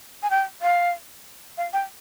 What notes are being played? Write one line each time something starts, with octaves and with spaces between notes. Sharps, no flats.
G#5
G5
F5
F5
G5